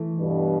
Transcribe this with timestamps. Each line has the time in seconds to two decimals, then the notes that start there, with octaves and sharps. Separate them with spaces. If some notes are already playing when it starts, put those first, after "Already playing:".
Already playing: E3 A3
0.18 G2 B2